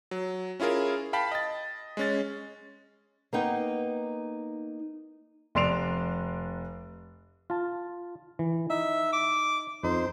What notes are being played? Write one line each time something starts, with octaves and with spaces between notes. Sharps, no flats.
F#3
C#4 E4 F4 G#4 A#4
F5 G5 A5 B5 B6
D#5 A6
G#3 C#4 A6
A#3 B3 D#4 G5
F1 D5 C6 C7 D7 F7
F4 A5
E3
D#4 E5
D6
F2 D#4 C5